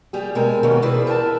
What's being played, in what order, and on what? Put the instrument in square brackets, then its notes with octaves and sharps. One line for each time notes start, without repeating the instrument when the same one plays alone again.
[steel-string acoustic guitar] G3 G4 G#4
B2 G#3 C4 G4 A#4
B2 D#3 E3 B3 C#4
C4 E4 G#4 B4 C5 D5
A#4 B4 G#5 A5